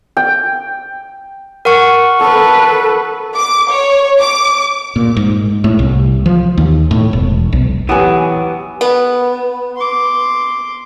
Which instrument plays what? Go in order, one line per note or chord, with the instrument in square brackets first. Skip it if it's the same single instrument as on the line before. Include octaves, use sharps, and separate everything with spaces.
[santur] G5
[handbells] A#4 F#5 C#6
[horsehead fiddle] A4 B4
[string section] D6
C#5
D6
[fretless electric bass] A#2
G#2
A2
C2
F3
D#2
A2
E1
B1
[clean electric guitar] E3 F#3 B3 [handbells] E4 G4 B4 [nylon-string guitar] F#5 G#5
[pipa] B3
[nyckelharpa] C6 D6